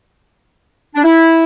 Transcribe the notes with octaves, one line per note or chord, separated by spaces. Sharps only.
D4
E4